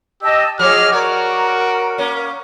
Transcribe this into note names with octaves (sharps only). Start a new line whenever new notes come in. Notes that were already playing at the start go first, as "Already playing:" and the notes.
G4 D#5 A5 E6
F3 F#3 G#4 D#5 D6 F6
F#4 A#4 C#5 D5
A#3 C#4